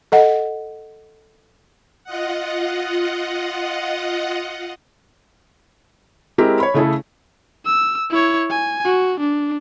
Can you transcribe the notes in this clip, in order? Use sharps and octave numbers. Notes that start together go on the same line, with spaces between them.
A4 D#5 F#5
F4 D#5 F#5
G#3 C4 E4 G4 A#4
C#5 B5
C#3 A3 E4 G#4 A4
E6
E4 C#5
G#5
F#4
D4